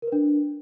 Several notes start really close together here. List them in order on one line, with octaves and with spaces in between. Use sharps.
A#4 B4 D4